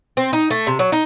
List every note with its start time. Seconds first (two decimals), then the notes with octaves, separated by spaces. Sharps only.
0.17 C4
0.33 D#4
0.51 A3
0.67 C3
0.79 F#3
0.92 D#4